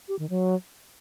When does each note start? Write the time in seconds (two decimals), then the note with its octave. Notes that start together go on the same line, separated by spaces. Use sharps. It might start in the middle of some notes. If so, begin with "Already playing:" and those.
0.08 G4
0.19 D#3
0.30 F#3